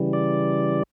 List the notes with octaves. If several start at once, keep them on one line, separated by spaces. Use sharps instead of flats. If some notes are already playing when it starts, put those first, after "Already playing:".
Already playing: C#3 E3 G3
D5